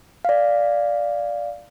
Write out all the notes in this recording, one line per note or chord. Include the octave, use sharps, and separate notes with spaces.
D5 F5